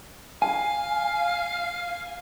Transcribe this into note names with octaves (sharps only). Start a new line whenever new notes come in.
F5 G#5